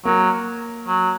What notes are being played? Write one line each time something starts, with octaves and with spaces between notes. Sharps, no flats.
F#3 A#3 A#4
F#3